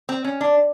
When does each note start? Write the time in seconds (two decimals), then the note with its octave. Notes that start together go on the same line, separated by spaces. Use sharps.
0.09 C4
0.24 C#4
0.41 D4